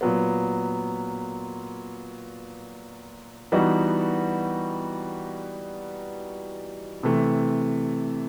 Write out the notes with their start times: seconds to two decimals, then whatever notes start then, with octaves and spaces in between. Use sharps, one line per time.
0.01 A#2 F#3 B3
3.52 E3 G3 B3 D#4 F#4
7.03 C3 E3 A3